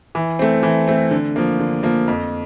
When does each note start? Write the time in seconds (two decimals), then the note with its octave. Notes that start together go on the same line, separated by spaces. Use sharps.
0.15 E3
0.39 A3 C4
0.63 E3
0.88 A3 C4
1.11 D3
1.36 F3 A#3
1.59 D3
1.83 F3 A#3
2.08 F2